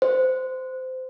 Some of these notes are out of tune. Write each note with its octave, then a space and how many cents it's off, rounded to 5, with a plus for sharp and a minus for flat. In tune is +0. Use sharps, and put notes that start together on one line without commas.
C5 -20